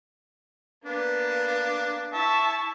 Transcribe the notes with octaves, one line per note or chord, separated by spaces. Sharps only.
A#3 B3 D4
E4 E5 A5 C#6